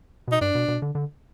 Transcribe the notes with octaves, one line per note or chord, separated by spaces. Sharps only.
B2 D#4
G2 D4
B2
B2
D3
D3